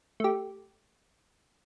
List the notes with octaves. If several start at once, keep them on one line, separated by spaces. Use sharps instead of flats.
A3 G4